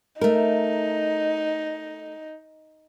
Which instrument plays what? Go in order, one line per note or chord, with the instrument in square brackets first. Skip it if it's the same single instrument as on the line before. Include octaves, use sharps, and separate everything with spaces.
[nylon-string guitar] A3 A#4 [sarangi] D#4